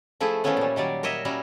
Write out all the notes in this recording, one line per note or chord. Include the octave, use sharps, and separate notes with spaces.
F3 A3 E4 G#4
E3 F3 A3 B3 C#4 E4
A#2 G3
D#3 F#3 G3 D5
A#4 C#5 D#5 E5
F#3 G3 C#4 E4 F#4 A#4